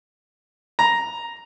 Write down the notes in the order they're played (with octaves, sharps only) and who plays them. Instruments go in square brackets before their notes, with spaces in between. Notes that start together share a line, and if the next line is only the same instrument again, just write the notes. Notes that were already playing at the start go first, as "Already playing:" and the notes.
[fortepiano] A#5